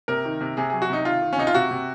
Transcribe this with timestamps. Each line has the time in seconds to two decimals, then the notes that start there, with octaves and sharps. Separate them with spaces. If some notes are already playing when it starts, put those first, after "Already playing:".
0.08 C3 A#4
0.25 D#3
0.41 C3
0.57 C3 G#4
0.70 F#3 G#4
0.82 F#4
0.90 C3 D#4
1.05 D#3 F4
1.22 D#3
1.33 C#4
1.38 C3 D#4
1.47 F4
1.55 C3 F#4
1.71 C3